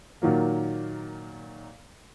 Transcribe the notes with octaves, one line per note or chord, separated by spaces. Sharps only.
A#2 D#3 F#3 A#3